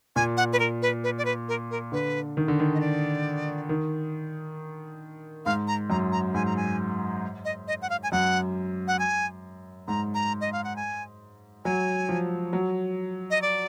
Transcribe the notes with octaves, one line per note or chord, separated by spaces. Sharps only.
A#2 G#5
F#5
B4
A#4
B4
B4
D5
B4
A#4
A#4
D3 B4
D#3
D3
D#3
D#5
D5
D#3
G#2 F5
A#5
F#2 A#5
A#5
G#2 G#5
A#5
G#5
D#5
D#5
F#5
F5
G#5
F#2 F#5
F#5
G#5
G#2 A#5
A#5
D#5
F5
F#5
G#5
F#3 G#5
F3
F#3
D#5
D5